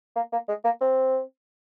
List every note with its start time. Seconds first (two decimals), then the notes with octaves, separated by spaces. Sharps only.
0.16 A#3
0.32 A#3
0.48 G#3
0.65 A#3
0.81 C4